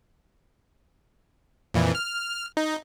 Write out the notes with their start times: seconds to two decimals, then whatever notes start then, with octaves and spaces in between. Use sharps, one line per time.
1.74 F2 A#2 E3
1.95 F6
2.57 D#4